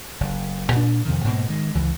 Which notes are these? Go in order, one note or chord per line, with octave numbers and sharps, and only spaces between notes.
F#1
A#2 D4
F2 C3 D#3
G#2 B2 A#3
D#3 G#3
C#2 E3